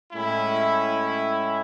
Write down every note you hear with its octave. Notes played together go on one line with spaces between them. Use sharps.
A2 G#3 C#4 E4